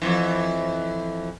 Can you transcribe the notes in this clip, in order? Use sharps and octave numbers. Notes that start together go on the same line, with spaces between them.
F2 G#2 E3